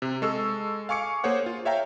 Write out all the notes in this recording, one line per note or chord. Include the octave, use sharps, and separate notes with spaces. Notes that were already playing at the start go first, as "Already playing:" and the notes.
C3
G#3 A4 C#6 E6
F5 G#5 C#6 D6 C#7
A#3 G#4 C5 C#5 F#5
F4
C#5 E5 F5 G5 A#5